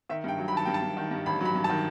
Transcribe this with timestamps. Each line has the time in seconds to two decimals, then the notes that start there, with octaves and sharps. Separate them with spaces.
0.09 D#3 E5
0.24 G2 G5
0.38 F#3
0.48 B5
0.53 D#3 A5
0.65 G2 G5
0.74 A5
0.82 G2
0.97 D#3
1.11 G2
1.26 A1 B5
1.41 F#3 B5
1.55 G2
1.64 A5
1.70 D#3